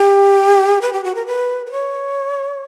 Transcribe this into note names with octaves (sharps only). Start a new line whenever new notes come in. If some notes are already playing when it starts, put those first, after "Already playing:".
Already playing: G4
B4
G4
F#4
A#4
B4
B4
C#5